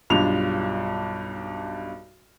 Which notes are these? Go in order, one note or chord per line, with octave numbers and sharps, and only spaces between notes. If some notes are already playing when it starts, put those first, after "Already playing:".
B1 G2 F4 F7